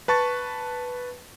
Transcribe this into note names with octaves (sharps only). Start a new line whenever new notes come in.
B4 A5 C#6 A6